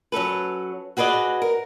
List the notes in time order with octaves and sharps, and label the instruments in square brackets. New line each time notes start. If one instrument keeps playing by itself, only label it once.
[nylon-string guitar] F#3 C#4 A4 B4
F#4 G#4 B4 D5 D#5
A#4